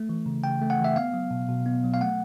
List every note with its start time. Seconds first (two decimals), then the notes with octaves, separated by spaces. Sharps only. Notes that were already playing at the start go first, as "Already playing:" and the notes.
Already playing: A3
0.09 E3
0.26 C#3
0.44 C#3 G5
0.62 A3
0.70 F#5
0.79 E3
0.84 E5
0.96 B3 F5
1.14 F#3
1.31 B2
1.49 B2
1.66 B3
1.84 F#3
1.94 F5
2.01 A3 F#5